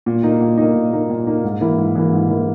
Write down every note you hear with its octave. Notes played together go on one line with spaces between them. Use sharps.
A#2
A#3 D#4
A#2
A#3 D#4
A#2
A#3 D#4
A#2
A#3 D#4
G#2
E3 A#3 E4
G#2
E3 A#3 E4
G#2
E3 A#3 E4